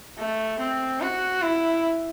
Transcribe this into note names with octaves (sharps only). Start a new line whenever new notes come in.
A3
C4
F#4
E4